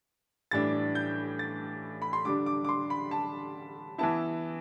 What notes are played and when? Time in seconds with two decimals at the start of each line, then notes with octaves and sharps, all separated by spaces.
0.51 A2 E3 G3 D4 A6
0.95 G6
1.39 A6
2.02 B5
2.13 C6
2.25 D3 G3 D4 D6
2.46 D6
2.65 D6
2.69 C6
2.90 B5
3.11 A5
3.98 E3 B3 E4 A5